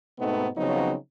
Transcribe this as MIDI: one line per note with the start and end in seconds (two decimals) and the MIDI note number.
0.19 0.48 44
0.19 0.48 47
0.19 0.48 57
0.19 0.48 59
0.19 0.48 60
0.19 0.48 63
0.56 0.94 49
0.56 0.94 53
0.56 0.94 54
0.56 0.94 59
0.56 0.94 60
0.56 0.94 63